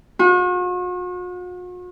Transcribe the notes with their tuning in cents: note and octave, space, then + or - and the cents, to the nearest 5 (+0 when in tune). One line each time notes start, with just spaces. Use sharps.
F#4 -45